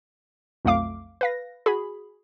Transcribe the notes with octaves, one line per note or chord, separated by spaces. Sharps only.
B1 F2 A3 F5 D6
B4 F5 A#6
F#4 G#4 B5